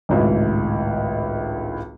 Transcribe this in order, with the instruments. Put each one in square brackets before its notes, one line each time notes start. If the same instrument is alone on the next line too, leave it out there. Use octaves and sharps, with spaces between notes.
[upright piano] G#1 C#2 A2